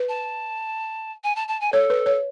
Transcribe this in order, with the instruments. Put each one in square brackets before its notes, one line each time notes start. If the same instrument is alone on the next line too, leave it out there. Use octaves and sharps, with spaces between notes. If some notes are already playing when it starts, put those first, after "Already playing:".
Already playing: [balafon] B4
[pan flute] A5
G#5
A5
A5
G#5
[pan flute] A4 [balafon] C#5
[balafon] B4
C#5